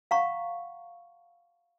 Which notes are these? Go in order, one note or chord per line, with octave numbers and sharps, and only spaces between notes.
F5 F#5 A#5 C#6